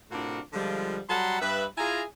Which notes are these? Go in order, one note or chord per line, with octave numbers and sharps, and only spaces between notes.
A2 C3 D4 F4 F#4 A#4
D3 F3 G3 G#3 D4 F4
F#3 G3 F#5 A5 B5 C6
G2 B4 E5
E4 F4 G#4 G#5 A#5